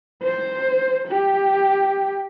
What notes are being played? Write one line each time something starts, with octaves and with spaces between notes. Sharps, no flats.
C5
G4